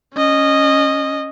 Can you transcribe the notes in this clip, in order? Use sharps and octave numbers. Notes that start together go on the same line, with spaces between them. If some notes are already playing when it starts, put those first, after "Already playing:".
C#4 D#5